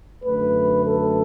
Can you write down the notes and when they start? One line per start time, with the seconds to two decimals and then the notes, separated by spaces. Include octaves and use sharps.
0.24 F#2 D3 A3 B4
0.87 A4